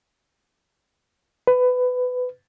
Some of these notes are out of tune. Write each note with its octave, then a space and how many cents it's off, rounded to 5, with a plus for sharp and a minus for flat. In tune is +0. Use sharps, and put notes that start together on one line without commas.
B4 +20